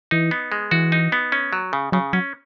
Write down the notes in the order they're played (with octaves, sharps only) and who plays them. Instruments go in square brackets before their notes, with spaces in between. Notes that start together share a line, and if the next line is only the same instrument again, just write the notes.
[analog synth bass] E3 [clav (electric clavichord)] D#4
[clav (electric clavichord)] B3
G#3
[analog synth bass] E3 [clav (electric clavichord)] F#4
[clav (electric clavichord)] D#4
B3
C#4
F#3
C#3
[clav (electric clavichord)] C#3 [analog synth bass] F#3
[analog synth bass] F#3 [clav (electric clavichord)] C#4